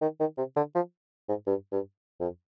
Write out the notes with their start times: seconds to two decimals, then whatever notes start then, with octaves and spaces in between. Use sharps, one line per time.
0.02 D#3
0.20 D#3
0.38 C3
0.56 D3
0.75 F3
1.29 G#2
1.47 G2
1.72 G2
2.20 F2